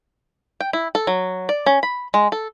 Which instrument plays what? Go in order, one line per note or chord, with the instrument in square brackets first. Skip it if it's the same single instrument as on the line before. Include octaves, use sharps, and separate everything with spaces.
[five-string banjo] G5
E4
A4
F#3
D5
C#4
B5
G#3
A4